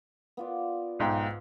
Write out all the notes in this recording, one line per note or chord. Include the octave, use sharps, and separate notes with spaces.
B3 F4 D5
B1 G#2 G5